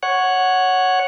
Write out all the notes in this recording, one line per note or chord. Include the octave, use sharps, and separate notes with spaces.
C#5 F#5